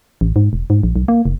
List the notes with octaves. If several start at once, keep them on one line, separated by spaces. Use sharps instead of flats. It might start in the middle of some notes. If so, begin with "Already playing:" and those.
A1
G#2
E1
G#2
A#1
B1
A#3
F1